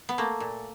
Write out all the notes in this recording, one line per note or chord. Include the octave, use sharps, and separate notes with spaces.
B3
A3 A#3
A#2